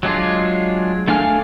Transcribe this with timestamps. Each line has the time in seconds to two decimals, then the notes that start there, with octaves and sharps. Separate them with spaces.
0.03 F#3 G#3 D4 F4
1.08 A3 D4 F5 G#5 F6